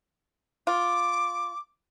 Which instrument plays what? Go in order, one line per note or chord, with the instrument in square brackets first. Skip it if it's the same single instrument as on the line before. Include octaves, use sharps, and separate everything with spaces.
[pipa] F4 [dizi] D6